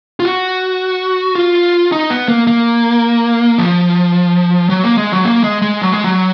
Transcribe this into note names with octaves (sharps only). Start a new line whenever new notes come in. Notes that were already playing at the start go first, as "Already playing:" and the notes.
F4
F#4
F4
D#4
B3
A#3
A#3
F3
F#3
A#3
G#3
F#3
A#3
G#3
G#3
F#3
G#3
F#3